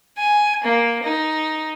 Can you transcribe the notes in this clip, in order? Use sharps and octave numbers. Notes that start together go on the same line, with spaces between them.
G#5
A#3
D#4